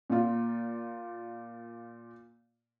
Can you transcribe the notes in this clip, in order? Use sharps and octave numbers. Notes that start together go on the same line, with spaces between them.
A#2 F4